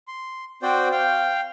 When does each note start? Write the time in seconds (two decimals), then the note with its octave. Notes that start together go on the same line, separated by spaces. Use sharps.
0.08 C6
0.62 C4 F#4 C5 D5 G5
0.92 F5 G5